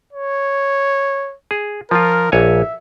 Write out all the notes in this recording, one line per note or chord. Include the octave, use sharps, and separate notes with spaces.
C#5
G#4
F3 F4 A#4
A#1 C#5 E5 G#5